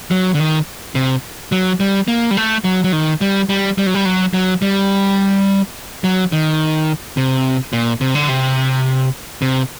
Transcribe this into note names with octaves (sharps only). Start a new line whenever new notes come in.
F#3
D3
D#3
C3
F#3
G3
A#3
G3
A3
F#3
F#3
D#3
G3
G3
G3
F#3
G3
F#3
F#3
G3
F#3
D#3
C3
A#2
C3
D3
C3
C3